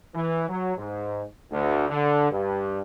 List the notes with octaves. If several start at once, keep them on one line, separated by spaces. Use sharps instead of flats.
E3
F#3
G#2
D2
D3
G2